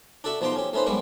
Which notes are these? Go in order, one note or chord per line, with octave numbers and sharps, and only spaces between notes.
D4 F#4 A4 E5 C#6
B2 F3 D#4 G4 G5 C6
C#4 G4
A3 C#4 D#4 B4 C5
F#2 G3 G#3 B3 C#6